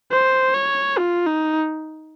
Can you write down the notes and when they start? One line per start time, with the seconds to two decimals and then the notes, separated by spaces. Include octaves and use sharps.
0.12 C5
0.54 C#5
0.98 F4
1.26 D#4